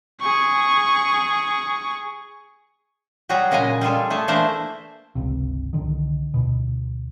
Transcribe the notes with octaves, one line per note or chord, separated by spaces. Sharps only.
G#4 C#6
F#3 G3 F#4 G#4 A#5
A#2 C#3 G#3 D#5 G#5 A#5
G3 F4 G#4 A4
A3 G#4 A4
E3 A3 A#3 D4 C5 E5
G1 C#2 C3
C2 D3 D#3
D2 B2